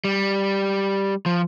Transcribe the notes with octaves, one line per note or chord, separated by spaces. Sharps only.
G3
F3